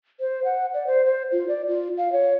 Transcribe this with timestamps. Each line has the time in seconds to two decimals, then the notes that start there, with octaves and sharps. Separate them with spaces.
0.20 C5
0.44 F#5
0.74 D5
0.87 C5
1.06 C5
1.32 F4
1.48 D5
1.68 F4
1.98 F5
2.12 C#5